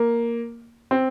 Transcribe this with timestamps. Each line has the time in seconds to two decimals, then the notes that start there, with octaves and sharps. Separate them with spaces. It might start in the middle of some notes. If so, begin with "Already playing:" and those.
Already playing: A#3
0.91 C4